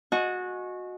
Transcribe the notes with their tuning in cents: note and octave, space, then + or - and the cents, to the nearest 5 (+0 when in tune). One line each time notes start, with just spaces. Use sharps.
F#4 -20 D#5 +0 G#5 +25